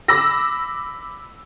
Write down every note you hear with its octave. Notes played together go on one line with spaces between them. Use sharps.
B5 D6 E6 A#6